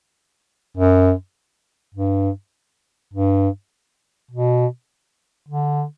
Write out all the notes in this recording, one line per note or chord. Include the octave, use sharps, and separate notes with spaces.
F#2
G2
G2
B2
D3